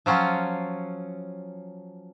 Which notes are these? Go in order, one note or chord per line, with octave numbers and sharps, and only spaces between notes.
F3 F#3 C#4 F4